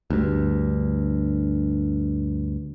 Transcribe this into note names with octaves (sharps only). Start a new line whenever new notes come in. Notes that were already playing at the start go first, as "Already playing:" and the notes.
D2 G2